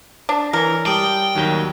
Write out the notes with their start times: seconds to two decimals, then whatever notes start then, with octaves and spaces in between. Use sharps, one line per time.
0.29 D4
0.53 E3 C#4 A#4
0.86 G3 G5 A5 D#6
1.35 D#2 D#3 F#3